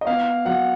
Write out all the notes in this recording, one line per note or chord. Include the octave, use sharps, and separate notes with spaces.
D#5
B3 F5
F#3 F#5